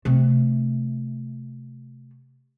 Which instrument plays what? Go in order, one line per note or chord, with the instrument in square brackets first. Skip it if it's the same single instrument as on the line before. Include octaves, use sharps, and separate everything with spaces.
[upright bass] C3 A3